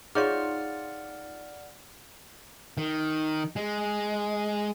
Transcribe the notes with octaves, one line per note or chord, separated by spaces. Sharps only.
D#4 F4 G#4 C#5 D5 F#5 C#6 F6
D#3
G#3